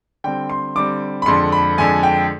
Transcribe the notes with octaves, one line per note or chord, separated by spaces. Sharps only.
D3 G3 C4 G5
C6
D3 G3 C4 D6
B5
F2 D3 G#3 C6
B5
F2 D3 G#3 G#5
G5